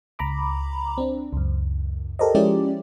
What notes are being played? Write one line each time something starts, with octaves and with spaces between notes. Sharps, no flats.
C#2 A#5 B5 D6
C4 D4
C#2 F#2
G4 A4 A#4 C5 D5 D#5
F3 G#3 C#4 E4 G4 D5